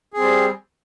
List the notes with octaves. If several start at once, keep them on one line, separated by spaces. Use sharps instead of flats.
G3 C4 G#4